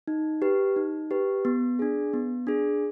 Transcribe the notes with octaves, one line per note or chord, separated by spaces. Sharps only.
D#4
G4 B4
D#4
G4 B4
B3
D4 G#4
B3
D4 G#4